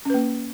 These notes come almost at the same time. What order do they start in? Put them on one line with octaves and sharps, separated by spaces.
C#4 B4 A#3